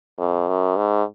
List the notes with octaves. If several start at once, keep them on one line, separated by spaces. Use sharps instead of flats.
F2
F#2
G#2